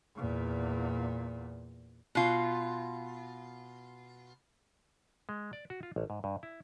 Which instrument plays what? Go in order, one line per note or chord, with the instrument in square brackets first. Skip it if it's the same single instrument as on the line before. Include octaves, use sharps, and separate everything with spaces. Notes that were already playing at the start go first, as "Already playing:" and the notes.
[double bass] E2 A#2
[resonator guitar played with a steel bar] B2 F4
[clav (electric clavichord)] G#3
D5
F#4
F4
A1
G#2
G2
E4